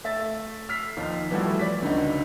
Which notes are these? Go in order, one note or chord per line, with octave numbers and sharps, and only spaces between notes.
A3 E5 A6
E6 F6 B6 C7
D#2 F3 D#4
E3 F3 G3 A3 E4 F#4
D5 B6
C#2 D3 D#4 F#4